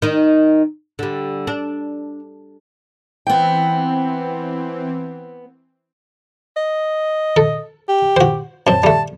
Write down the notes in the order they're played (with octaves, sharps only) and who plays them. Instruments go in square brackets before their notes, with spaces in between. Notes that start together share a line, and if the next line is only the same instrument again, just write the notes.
[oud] D#3 D#4
D3 G3
D4
[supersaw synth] E3 C4 [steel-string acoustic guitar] B3 G5
[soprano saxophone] D#5
[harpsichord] A4
[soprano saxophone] G4
[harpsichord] F#4 C5
[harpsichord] F#2 C4 [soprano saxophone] A5
[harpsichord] G3 A3